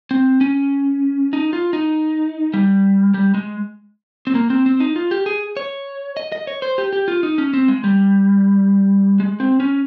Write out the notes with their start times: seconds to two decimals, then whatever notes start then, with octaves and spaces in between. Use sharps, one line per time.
0.11 C4
0.41 C#4
1.33 D#4
1.53 F4
1.73 D#4
2.54 G3
3.14 G3
3.34 G#3
4.27 C4
4.35 A#3
4.50 C4
4.66 C4
4.80 D#4
4.96 F4
5.11 G4
5.26 G#4
5.57 C#5
6.17 D#5
6.32 D#5
6.47 C#5
6.62 C5
6.78 G4
6.93 G4
7.08 F4
7.23 D#4
7.38 C#4
7.54 C4
7.68 G#3
7.84 G3
9.20 G#3
9.40 C4
9.60 C#4